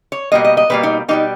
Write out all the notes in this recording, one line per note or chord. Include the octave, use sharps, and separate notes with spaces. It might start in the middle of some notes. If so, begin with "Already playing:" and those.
C#5
B2 G3 A#3 D#5
D#5
D#5
B2 G3 A#3 B4
D#4
B2 G3 A#3 D#4